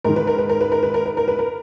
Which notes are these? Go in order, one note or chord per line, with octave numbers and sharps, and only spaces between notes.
G#2 D#3 A#4
B4
A#4
B4
A#4
B4
A#4
B4
A#4
B4
A#4
B4
A#4